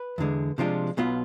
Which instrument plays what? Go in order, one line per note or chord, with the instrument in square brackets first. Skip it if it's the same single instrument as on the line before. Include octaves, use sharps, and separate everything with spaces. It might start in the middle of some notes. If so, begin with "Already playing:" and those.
Already playing: [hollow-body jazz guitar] B4
E2 D3 G#3
C3 F3 G#3 D4 F4
B1 B2 B3 F4